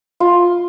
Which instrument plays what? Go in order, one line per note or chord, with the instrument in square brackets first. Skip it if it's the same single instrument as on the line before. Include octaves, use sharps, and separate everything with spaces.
[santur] F4